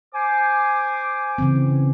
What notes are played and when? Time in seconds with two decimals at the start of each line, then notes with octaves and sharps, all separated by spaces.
0.14 C5 G#5 D6
1.38 C#3 E3 C4